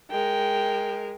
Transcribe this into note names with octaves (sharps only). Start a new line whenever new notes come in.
G#3 A#4 G5